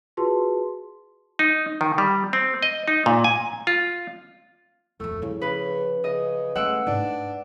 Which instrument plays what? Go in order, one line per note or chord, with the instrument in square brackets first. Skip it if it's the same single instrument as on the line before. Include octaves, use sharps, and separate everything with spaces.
[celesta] F4 F#4 G#4 B4 A5 C6
[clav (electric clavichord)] D#4
D#3
G3
C4
D#5
D#4
A#2
G#5
F4
[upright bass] D1 F2 [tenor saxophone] A3
[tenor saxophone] C#3 [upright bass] F3 E4
[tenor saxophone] C#3 [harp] B4
[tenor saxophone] C#3 [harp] D#5
[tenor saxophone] G#3 [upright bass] A3 C#4 [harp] F#5 E6 D7
[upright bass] G#2 [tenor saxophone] D4